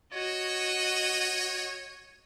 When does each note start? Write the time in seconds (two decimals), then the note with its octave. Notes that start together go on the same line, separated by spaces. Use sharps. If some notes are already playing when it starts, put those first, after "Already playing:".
0.13 F#4 C#5 D#5